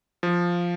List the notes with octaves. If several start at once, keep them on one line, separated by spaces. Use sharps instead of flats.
F3